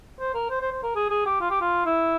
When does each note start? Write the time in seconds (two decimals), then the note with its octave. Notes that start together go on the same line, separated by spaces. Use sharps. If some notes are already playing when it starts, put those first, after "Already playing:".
0.20 C5
0.34 A#4
0.50 C5
0.61 C5
0.72 C5
0.83 A#4
0.96 G#4
1.10 G#4
1.26 G4
1.41 F4
1.50 G4
1.61 F4
1.86 E4